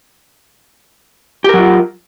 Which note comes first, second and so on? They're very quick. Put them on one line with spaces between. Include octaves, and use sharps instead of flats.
G4 A#4 F#3 F4